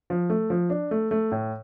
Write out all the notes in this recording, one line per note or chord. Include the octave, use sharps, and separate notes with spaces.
F3
A3
F3
D4
A3
A3
A2